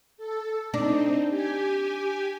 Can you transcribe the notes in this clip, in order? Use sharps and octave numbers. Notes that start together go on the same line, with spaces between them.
A4
C4 D4 D#4
G4 G#5